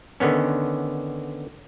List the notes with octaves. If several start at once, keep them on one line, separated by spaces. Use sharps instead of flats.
D3 D#3 B3 C#4